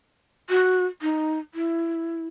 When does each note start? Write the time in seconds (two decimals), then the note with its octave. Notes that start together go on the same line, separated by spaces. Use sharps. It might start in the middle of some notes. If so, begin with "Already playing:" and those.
0.50 F#4
1.02 D#4
1.54 E4